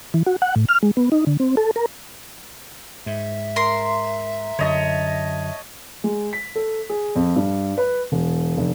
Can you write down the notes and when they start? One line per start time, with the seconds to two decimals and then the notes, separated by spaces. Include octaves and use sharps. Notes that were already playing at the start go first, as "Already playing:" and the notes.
0.14 E3
0.26 F#4
0.42 F#5
0.56 A2
0.69 F6
0.83 G#3
0.97 B3
1.12 D#4
1.27 D3
1.40 C4
1.57 A4
1.76 A#4
3.06 G#2 E5
3.56 A#4 C6
4.59 F#2 D3 C#5 D#5 A5
6.04 G#3
6.33 B6
6.55 A4
6.89 G#4
7.15 F2
7.36 G2
7.77 B4
8.12 E1
8.57 F1